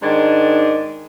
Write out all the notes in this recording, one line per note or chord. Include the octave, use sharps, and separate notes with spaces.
G#2 D#3 D4